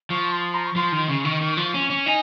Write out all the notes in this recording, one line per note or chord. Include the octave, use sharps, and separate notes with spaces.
F3 C#6
C6
A#5
C#6
F3 C6
D#3
C#3 C#6
D#3
D#3
F3
C#4
C#4
D#4 G#5